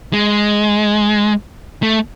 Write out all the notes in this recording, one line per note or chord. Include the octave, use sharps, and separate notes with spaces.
G#3
A3